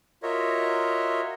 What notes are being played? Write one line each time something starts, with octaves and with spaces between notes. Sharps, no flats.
F4 F#4 A#4 C#5 D#5 E5